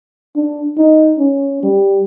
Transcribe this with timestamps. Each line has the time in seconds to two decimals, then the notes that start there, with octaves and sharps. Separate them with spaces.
0.36 D4
0.78 D#4
1.18 C#4
1.63 G3